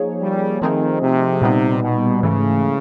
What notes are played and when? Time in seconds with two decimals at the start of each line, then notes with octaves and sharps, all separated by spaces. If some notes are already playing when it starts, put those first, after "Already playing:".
Already playing: F3 A#3 D#4 G#4 C#5
0.22 G3
0.62 D#3 F3 A3 C4 D#4 G#4
1.02 C3
1.42 A#2 G3 B3 D#4
1.82 B2
2.22 G#2 C#3 E3 A3